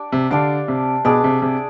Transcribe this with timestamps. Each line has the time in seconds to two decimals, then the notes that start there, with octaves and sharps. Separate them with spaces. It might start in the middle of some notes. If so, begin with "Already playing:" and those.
Already playing: D4 G4 D5
0.12 C3
0.30 D3 D4 G4 D5 F5
0.68 C3
1.05 B2 D4 G#4 D5
1.24 C3
1.42 C3